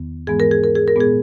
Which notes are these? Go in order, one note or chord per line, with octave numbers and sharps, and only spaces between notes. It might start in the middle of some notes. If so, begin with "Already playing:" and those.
Already playing: E2 D#3 B3
G#2 E3 G#3 B3 G#4
A#4
G#4
A#4
G#4
A#4
A#2 G#3 B3 G#4